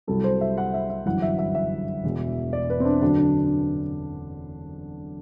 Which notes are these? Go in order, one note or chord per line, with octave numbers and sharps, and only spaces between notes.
C2 C3 F#3 A4
C5
E5
F#5
E5
E5
G1 F#2 E3 F#5
E5
E5
E5
E1 E2 B2
D5
B4
C4
D4
F#2 D3 F#3 D4
D4